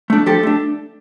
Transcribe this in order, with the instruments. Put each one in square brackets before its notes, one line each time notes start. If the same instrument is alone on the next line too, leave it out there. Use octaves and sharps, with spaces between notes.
[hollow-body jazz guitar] A3 D4
F3 G4 A4
A3 D4